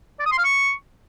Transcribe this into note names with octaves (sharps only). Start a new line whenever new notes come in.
D5
D#6
C6
F5
C#6